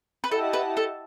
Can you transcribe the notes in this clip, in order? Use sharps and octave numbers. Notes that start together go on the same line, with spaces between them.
B4
E4 G4 A4 D#5 F#5 A5
B4
A4